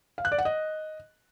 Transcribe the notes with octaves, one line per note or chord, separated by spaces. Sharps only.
F5
F#6
D5
F#5
D#5